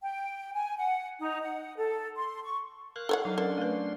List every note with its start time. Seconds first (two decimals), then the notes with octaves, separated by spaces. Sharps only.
0.02 G5
0.54 G#5
0.77 F#5
1.19 D#4
1.42 F#5
1.77 A4
2.16 C6
2.44 C#6
2.96 A#4 F5 F#6
3.09 A4 C#5 F#5
3.25 F#3 D#4 F5
3.38 C#4 D4 A4 A#4 C6
3.58 A3 B4